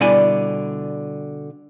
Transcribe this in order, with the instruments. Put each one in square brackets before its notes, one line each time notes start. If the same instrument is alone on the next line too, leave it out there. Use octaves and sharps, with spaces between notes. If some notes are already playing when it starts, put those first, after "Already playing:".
[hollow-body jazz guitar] B2 D3 G3 E4 D5 G#5